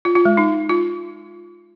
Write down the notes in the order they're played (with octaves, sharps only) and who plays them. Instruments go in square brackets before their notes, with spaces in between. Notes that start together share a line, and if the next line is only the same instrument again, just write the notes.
[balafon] F4
F4
G#3
D#4
F4